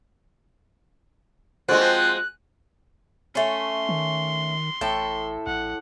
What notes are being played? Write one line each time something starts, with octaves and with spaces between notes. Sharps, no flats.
D3 G#3 C4 F4 F#4 F#6
F3
A3 C#4 C6
D#3
A1 A2 A4 G5
A#1 F#5